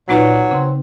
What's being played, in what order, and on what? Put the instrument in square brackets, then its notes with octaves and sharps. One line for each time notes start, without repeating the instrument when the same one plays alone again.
[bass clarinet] A#2 [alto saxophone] F#3 [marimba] C4 D#4 B4
[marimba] C#3 [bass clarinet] C4